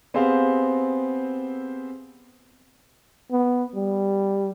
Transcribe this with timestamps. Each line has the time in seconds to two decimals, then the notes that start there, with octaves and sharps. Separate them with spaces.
0.14 B3 C4 G4 G#4 C5 F5
3.31 B3
3.74 G3